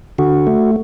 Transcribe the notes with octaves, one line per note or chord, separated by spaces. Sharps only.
D3 F#4
A3